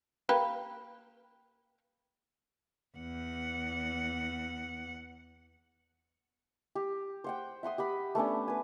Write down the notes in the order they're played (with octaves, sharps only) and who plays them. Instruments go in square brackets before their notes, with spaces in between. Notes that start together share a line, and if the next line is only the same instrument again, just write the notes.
[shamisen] A#3 G4 B4
[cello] E2 F#5
[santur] G4
C5 F#5 G5
E5 F#5 C6 D#6
G4 F#5 B5
A3 B3 C#4 D4
B4 G#5